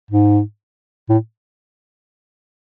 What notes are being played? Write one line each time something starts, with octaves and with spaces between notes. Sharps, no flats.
G#2
A2